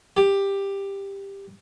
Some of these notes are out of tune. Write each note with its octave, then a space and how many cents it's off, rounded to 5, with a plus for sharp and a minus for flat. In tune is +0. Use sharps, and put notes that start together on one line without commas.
G4 +10